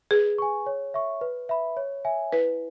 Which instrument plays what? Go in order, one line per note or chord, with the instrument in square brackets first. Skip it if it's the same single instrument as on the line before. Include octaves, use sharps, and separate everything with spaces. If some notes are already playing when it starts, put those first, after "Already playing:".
[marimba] G#4 [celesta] B4
[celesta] G#5 C#6
C#5
E5 C#6
B4
E5 B5
C#5
E5 G#5
[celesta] E4 [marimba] B4